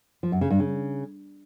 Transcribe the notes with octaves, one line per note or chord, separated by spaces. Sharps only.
F3
F#2
C#3
G2
C#3